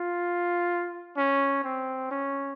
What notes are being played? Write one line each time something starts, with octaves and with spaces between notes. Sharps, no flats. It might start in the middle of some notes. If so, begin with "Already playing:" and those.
Already playing: F4
C#4
C4
C#4